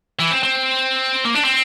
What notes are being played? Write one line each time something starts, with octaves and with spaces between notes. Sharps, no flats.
E3
C4
C4
A#3
D4
C4